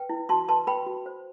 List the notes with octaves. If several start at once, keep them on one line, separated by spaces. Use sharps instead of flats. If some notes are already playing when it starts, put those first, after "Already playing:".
Already playing: B4 G5
E4
F#4 A5 C6
B4 A5 C6
B4 G5 B5
F#4
C5